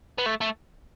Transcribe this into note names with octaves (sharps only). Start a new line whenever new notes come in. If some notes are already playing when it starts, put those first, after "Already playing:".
B3
A3
A3